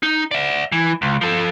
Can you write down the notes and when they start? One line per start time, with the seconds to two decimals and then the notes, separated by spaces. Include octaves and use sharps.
0.03 D#4
0.31 D5 E5
0.72 E3
1.02 C#2
1.21 F3 A4